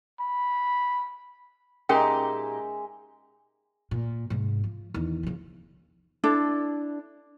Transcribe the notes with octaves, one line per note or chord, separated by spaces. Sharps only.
B5
A#2 G#3 C#4 D#4 G4 A#4 E5 G5
A#2
G#2 C3
F3
E2 D#3
C#3 F3
D4 E4 A4